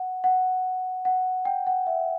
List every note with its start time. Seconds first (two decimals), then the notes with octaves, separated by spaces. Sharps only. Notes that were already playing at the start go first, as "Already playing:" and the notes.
Already playing: F#5
0.24 F#5
1.05 F#5
1.45 G5
1.67 F#5
1.87 E5